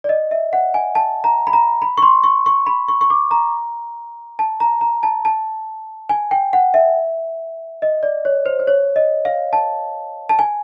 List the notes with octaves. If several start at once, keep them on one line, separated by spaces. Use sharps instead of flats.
D5
D#5
E5
F#5
G#5
A5
A#5
B5
A#5
B5
C#6
C6
C#6
C#6
B5
C#6
C#6
D6
A#5
A5
A#5
A#5
A5
A5
G#5
G5
F#5
E5
D#5
D5
C#5
C5
C5
C#5
D#5
F5
A5
A5
G#5